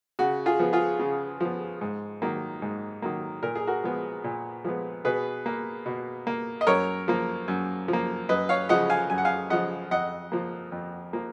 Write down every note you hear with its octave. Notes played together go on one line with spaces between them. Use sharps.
C#3 F#4
F4 G#4
F3 B3
F4 G#4
C#3
F3 B3
G#2
D#3 F#3 A#3
G#2
D#3 F#3 A#3
A#2 A#4
G#4
F#4 A#4
F3 G#3 B3
A#2
F3 G#3 B3
B2 G#4 B4
A#3
B2
A#3
D#5
F#2 A#4 C#5
F3 A#3
F#2
F3
A#3
F#2 B4 D#5
C#5 F5
C#3 F3 D#5 F#5
F5 G#5
F#2 G#5
F#5
F5 G#5
C#3 F3 D#5 F#5
F2 D#5 F#5
F3 A#3
F2
F3 A#3